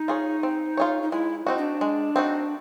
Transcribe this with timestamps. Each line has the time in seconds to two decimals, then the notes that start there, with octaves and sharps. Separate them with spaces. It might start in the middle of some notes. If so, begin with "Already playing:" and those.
Already playing: D#4
0.08 F4 G#4 C#5
0.43 C4
0.77 F4 G#4 C#5
1.02 D#4
1.11 G#3 E4
1.47 C4 D#4 F#4
1.58 D4
1.81 G#3
2.16 C4 D#4 F#4